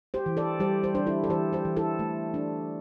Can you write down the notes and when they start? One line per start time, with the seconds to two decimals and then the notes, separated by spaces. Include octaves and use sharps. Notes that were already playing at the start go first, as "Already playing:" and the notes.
0.14 G4 C5
0.26 E3
0.37 A4 D5
0.60 G3 G4 C5
0.83 G4 C5
0.95 D4 C5
1.07 E4 A4
1.24 A4
1.29 E3 G4 C5
1.53 G4 C5
1.65 E3
1.76 E4 A4
1.99 A3
2.34 D4